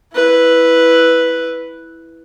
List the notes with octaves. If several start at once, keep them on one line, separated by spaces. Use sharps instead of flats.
E4 B4